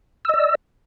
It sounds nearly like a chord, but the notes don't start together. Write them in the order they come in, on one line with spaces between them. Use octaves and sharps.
E6 D#5 D5